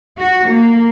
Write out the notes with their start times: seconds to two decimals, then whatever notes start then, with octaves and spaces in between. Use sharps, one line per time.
0.18 F#4
0.48 A#3